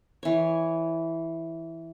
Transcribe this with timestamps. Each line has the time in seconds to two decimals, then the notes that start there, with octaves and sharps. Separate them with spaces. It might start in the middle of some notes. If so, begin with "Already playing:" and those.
0.23 E3 C#5